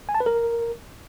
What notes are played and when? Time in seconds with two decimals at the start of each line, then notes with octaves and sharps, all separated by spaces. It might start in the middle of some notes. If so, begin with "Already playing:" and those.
0.09 G#5
0.15 A5
0.20 B4
0.26 A#4